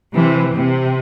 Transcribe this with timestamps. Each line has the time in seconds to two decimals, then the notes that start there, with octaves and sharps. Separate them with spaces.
0.16 C3 E3
0.54 C3